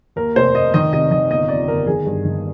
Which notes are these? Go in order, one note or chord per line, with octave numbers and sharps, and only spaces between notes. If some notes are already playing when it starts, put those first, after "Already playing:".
D#2 A#4
F1 C5
F1 D#5
D#3 D#5
C3 D#5
D#3 D#5
G1 D#5
F2 D5
G1 A#4
D#3 G#4
G2
D#3